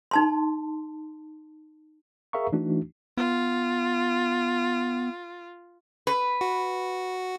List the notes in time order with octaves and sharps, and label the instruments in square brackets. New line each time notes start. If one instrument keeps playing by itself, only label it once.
[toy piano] D#4 A5 C6
[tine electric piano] G#4 A#4 E5 F5 A#5 C#6
E3 A3 D4 D#4 F#4
[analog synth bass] B3 [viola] F4
[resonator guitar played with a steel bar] B4
[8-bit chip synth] F#4